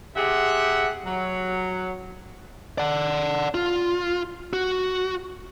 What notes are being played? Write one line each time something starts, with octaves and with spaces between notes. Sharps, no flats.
C3 G4 G#4 E5 F#5
F#3
D5 F#5
F4
F#4